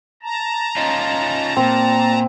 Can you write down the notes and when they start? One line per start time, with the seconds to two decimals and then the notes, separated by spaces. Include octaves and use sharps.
0.23 A5 A#5
0.76 C#4 D#4 F4
1.56 A#2 C4